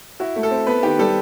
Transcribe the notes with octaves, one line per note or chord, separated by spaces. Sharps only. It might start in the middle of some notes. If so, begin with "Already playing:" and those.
E4 F#4
A3
A4
C4
B3 B4
D#3 G4
G3 A4